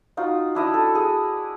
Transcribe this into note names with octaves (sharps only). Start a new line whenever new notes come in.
D#4 F4 F#4
D4 E4 D#5
A4
G#4